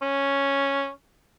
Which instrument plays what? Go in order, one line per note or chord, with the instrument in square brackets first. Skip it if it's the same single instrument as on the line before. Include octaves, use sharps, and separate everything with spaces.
[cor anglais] C#4